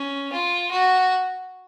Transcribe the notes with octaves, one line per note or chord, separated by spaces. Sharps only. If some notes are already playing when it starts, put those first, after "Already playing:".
Already playing: C#4
F4
F#4